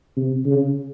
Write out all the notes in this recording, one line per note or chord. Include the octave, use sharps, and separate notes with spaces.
C3
C#3